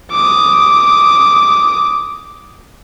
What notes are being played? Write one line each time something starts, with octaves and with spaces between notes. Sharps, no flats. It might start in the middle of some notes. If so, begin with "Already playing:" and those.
D6 D#6